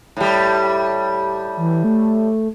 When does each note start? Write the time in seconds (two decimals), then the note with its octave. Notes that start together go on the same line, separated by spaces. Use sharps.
0.17 A2 G3
1.57 E3
1.84 A3